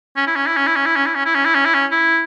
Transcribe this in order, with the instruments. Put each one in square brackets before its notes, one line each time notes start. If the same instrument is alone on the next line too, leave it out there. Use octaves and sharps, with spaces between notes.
[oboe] C#4
E4
C#4
E4
C#4
E4
C#4
E4
C#4
E4
C#4
E4
C#4
E4
C#4
E4
C#4
E4